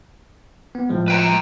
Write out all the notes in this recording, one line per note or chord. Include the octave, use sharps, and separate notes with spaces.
B3
A2 F3 G#3
B4 G5 A#5